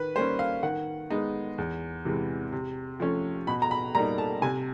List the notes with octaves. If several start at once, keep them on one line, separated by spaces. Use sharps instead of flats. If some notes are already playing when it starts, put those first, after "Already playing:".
Already playing: D#3 B4
G3 A#3 C#4 C5
F5
D#3 F#5
G#3 B3 D#4
E2
C3 E3 G#3
C3
F3 A3 C#4
B2 B5
A#5
B5
G3 A#3 D#4 A#5
A5
C3 G#5